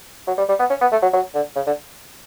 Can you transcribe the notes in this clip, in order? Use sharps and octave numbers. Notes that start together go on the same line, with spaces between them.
F#3
G3
G3
B3
C#4
B3
A3
F#3
F#3
D3
C#3
D3